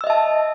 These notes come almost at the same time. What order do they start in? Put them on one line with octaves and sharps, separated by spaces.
E6 D#5 E5 A5